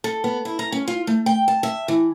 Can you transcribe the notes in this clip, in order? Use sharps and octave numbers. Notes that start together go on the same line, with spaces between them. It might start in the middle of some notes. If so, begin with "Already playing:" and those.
A4
B3
E4
A#5
C#4
F4
A3
G5
A5
E5
E3